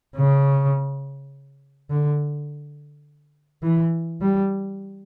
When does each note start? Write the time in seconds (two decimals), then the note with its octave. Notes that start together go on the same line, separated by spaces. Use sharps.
0.16 C#3
1.90 D3
3.63 E3
4.21 G3